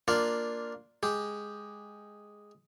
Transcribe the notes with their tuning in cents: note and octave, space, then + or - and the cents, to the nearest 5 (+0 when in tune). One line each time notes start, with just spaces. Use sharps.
A#3 +0 D4 +0 F4 +0
G#3 +0 G4 +0